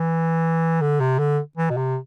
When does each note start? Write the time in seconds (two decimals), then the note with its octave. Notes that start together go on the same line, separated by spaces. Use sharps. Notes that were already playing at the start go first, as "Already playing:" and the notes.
Already playing: E3
0.81 D3
1.00 C3
1.19 D3
1.57 E3
1.70 B2
1.77 C3